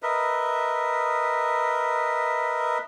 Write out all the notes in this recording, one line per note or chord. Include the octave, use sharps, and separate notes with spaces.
A#4 B4 D#5 E5